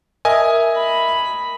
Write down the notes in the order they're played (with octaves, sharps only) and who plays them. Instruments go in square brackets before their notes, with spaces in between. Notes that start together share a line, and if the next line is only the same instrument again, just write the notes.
[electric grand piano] A#4 D#5 G#5 [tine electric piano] E5
[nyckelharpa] B5